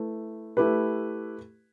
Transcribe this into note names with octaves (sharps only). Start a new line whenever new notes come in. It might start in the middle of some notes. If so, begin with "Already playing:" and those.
Already playing: A3 E4 B4
A3 E4 G4 B4